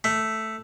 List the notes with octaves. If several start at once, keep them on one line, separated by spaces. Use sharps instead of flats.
A3